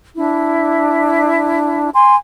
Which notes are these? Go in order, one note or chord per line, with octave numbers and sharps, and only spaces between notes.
D4 E4
G#5 C6